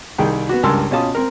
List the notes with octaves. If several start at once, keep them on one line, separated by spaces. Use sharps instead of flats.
C2 D#3 G#4 G5 A#5
B3 F#4
C#2 G2 A#4 A5 C6 E6
B2 C#4 F4 A5 D#6
C4 A#4